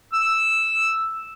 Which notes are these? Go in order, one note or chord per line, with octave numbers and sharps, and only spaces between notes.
E6